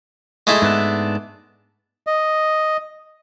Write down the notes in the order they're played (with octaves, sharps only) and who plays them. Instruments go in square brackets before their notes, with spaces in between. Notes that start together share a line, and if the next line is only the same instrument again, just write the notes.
[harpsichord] G#3 A3 E4
[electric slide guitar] G#2 B3 D4
[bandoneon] D#5